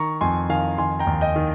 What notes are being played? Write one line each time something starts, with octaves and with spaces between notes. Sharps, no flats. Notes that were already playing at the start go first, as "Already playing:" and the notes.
Already playing: D#3 A#5 C#6
F2 G#5 C6
D#3 F5 G#5
D#3 G#5 C6
G5 A#5
D#2
D#5 G5
D#3